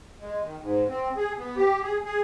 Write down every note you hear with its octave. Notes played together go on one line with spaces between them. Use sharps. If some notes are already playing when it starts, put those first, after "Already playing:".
G#3
D#3
G#2
C4
G#4
B3
G4
G#4
G#4